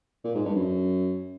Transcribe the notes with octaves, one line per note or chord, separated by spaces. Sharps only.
A#2
G#2
G2
F#2